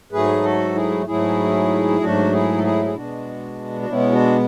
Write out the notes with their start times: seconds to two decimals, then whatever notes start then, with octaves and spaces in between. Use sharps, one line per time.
0.12 G#2 F#3 A3 G#4 B4
0.43 F#4 A4
0.75 E4 G#4
1.06 G#2 F#3 A3 E4 G#4
2.00 G#2 F#3 A3 D4 F#4
2.32 E4 G#4
2.58 A4
2.63 E4 G#4
2.85 G#4
2.94 B2 G#3 B3 D4 F#4
3.81 F#4
3.89 B2 G#3 B3 C#4 E4
4.12 D4 F#4